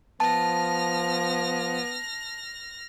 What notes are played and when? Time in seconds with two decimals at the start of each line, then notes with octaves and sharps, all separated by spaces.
0.20 F3 B3 A5 F6 A#6